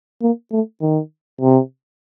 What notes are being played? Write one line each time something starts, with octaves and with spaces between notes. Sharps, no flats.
A#3
A3
D#3
C3